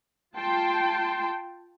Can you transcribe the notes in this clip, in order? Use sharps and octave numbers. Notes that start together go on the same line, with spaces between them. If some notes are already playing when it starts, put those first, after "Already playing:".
F4 G5 A5 C6